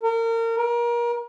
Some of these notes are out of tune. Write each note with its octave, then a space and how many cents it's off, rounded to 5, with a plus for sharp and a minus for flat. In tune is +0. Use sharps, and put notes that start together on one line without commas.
A#4 -30
A#4 +30